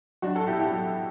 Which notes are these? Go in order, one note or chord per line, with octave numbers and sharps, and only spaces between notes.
F#3 D4 F#4
F#4 A4
B2 E4 G4
E4 G4
F#3